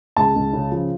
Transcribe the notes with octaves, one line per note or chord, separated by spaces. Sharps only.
C#2 A5
C#2
C#3
F3